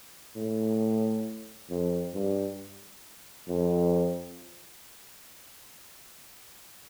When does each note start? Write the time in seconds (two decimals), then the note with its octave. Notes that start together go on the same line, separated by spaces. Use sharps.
0.36 A2
1.70 F2
2.14 G2
3.48 F2